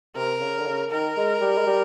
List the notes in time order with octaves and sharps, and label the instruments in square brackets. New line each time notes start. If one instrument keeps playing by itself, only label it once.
[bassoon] C3 [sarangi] A#4
[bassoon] C#3
D3
C#3
[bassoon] D#3 [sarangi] A#4
[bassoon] G#3
G3
G#3
G3